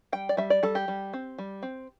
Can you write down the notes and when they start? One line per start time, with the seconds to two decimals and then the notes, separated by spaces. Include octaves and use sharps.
0.12 G3 G5
0.29 D5
0.37 G3 E5
0.50 D5
0.63 G3 A4
0.75 G4
0.88 G3
1.13 C4
1.38 G3
1.63 C4